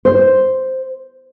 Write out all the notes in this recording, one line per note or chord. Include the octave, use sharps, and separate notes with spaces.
C5